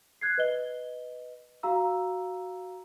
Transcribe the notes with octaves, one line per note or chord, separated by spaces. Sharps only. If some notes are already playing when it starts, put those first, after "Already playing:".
F#6 G#6 C7
B4 D#5 G7
F#4 F5 A#5 E6